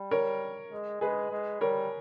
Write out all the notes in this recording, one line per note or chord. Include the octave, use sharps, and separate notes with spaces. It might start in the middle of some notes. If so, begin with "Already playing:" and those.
Already playing: G3
A#4 C#5
G#3
G#3 G#4 B4
G#3
G3 A#4 C#5